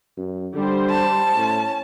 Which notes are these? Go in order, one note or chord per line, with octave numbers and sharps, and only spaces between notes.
F#2
D3 G3 C5
A5
A2 C#4